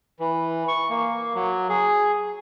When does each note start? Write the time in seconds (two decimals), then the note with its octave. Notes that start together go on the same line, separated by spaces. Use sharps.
0.20 E3
0.68 C#6
0.90 A#3
1.35 F#3
1.69 G#4